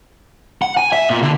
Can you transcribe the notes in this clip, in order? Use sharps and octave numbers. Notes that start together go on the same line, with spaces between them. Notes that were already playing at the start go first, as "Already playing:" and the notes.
F#5
G#5
E5
A#2
D3